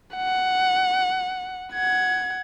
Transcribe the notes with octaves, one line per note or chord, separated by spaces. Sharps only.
F#5
F#5 G#6